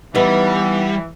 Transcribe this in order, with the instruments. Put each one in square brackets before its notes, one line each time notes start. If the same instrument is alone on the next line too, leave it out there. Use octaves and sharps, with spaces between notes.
[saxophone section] E3 [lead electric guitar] G3 [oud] B3 D#4 [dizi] F#5